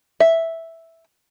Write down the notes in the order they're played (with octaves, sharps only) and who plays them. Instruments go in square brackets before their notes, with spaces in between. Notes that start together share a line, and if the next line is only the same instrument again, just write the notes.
[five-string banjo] E5